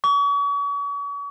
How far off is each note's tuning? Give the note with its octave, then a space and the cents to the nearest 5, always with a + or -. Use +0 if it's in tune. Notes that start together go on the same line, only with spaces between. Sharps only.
C#6 +40